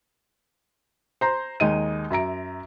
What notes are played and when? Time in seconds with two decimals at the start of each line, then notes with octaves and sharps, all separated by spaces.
1.21 C5 A#5 C6
1.60 D#2 G#3 D#4 D#7
2.10 F#2 E5 A#5 D7